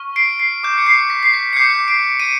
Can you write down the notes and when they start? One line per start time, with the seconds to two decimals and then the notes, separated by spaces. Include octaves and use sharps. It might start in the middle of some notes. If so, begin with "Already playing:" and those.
Already playing: C#6 F6
0.16 C7 D7
0.39 C7
0.63 D6 G6
0.78 C#7
0.87 C7
1.10 B6
1.23 C7
1.33 B6
1.53 C#7
1.57 D6 G6 C7
1.88 C7 D7
2.20 C#7 D#7